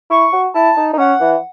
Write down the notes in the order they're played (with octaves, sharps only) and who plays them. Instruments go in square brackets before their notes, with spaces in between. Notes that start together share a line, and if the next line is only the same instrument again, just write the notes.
[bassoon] E4 [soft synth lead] C#6
[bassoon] F#4
[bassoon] E4 [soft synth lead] A5
[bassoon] D#4
D#4
[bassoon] C#4 [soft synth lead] F#5
[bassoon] E3